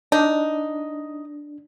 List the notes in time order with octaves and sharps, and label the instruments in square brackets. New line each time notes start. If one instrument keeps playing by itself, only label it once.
[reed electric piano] D4 [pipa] D#4